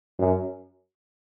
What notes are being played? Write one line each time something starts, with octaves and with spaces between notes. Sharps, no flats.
F#2